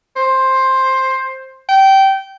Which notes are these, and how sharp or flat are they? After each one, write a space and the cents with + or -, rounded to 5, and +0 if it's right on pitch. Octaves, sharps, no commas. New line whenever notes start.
C5 +10
G5 -20